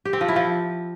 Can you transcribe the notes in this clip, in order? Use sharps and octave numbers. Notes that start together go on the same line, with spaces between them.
G4
C4
F3
E4
F3